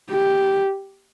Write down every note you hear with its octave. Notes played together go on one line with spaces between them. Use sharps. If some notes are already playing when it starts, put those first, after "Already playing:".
G4